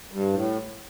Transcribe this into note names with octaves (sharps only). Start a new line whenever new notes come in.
G2
A2